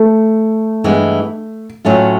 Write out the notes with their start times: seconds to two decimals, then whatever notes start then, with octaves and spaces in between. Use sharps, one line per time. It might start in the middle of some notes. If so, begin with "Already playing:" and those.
Already playing: A3
0.84 G2 E3 G#3 B3
1.85 A2 F#3 A3 C#4 F4